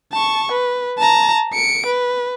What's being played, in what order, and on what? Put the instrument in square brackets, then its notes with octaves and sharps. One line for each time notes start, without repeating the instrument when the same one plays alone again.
[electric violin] A5 C#6
B4
A5 A#5
C#7 D7
B4